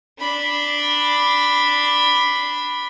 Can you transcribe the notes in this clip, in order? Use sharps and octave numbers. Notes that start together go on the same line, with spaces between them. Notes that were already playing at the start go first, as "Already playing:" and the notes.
D4 B5